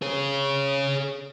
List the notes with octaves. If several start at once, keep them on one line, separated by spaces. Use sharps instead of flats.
G#4 C#5